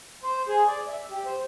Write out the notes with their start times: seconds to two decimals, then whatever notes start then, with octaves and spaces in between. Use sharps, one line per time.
0.23 C5
0.48 G#4
0.67 D5
0.88 E5
1.11 G4
1.26 C5